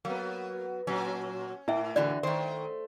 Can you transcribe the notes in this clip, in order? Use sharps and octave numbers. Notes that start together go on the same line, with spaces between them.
F#3 A#3 B3
A#2 F#3 C#4
A2 E4 E5 G5
D3 E3 F#4 D5
D#3 A3 C5